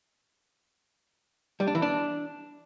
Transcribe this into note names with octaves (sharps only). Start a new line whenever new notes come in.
G3
D4
E3
D4